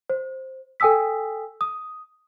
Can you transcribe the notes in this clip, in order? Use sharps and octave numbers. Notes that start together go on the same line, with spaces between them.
C5
A4 G5 G#5 D#6 E6 B6
D#6